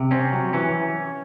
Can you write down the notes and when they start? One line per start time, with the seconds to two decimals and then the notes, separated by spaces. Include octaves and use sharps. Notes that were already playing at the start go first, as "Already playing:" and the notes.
Already playing: C3
0.11 C4 C#4
0.33 F#3
0.53 E3 C#4